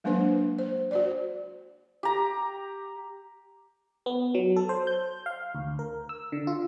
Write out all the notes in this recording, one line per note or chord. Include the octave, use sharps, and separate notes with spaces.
F#3 G#3 A#3 D4 B4 C5
C5
F#4 C5 D5
G4 A#5
B3
F#3
A4
C5
G6
F5
D2
A#4
E6
D3
F4